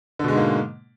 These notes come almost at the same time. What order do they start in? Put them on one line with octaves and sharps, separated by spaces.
D3 B2 G#3 G#2 A#3